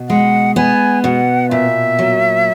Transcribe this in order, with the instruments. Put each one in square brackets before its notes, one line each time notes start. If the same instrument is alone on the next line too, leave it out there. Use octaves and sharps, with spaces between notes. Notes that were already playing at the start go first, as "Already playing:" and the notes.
Already playing: [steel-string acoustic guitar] B2
[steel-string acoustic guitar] G#3 [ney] F#5
[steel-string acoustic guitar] B3 [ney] G#5
[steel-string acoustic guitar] B2 [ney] F#5
[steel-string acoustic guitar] A#2 [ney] E5
[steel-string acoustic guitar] F#3